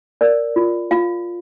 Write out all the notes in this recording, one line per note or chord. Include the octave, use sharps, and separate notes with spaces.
A#4 D5
F4
F4 F5